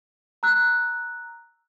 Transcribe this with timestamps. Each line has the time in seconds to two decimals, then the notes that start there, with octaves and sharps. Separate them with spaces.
0.43 A#5 E6 F#6